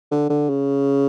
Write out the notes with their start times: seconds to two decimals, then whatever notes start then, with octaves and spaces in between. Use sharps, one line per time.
0.11 D3
0.30 D3
0.49 C#3